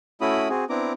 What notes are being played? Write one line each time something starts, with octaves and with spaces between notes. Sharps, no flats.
A3 C#4 E4 F#4 B5 D#6
C4 F#4 G#4
B3 C4 D4 E4 A#5 D6